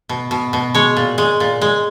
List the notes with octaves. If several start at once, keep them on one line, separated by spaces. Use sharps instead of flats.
B2
B2
B2
G#3 C#5
A#2
G#3
A#2
G#3